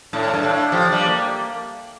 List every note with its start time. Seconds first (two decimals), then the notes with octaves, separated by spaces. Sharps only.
0.13 A2 D4
0.34 G2
0.43 A2 D4
0.72 F3 G4
0.92 G3
1.01 A#3